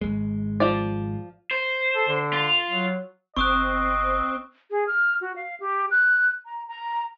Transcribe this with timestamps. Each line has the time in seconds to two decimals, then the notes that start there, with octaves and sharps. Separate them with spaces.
0.01 G#1 C#2 G#3
0.60 F3 F4 D5
1.51 C5
1.95 A4
2.08 D3
2.33 F4
2.70 F#3
3.36 G1 C4 D#5 C#6 D#6 F#6
4.71 G#4
4.88 F6
5.21 F#4
5.36 F5
5.60 G4
5.91 F#6
6.46 A#5
6.68 A#5